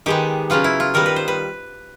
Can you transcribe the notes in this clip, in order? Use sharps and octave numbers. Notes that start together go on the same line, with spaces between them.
D#3 G#3 B3 G4
C#3 F#3 B3 F4
E4
F4
D#3 G3 B3 A#4
B4
C5
B4